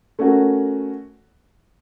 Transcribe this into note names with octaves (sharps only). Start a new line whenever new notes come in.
A3 C#4 F#4 A#4